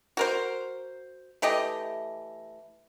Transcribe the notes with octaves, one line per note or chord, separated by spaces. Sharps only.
F#4 A#4 C5
E3 A3 G4 D#5